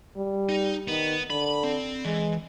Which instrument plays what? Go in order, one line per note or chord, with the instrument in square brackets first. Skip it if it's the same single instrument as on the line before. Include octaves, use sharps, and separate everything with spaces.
[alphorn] G3
[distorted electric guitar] D#4
[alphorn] D#3 [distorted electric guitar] B3
[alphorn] D3 [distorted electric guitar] B5
[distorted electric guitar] C4
[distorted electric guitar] E3 [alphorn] G#3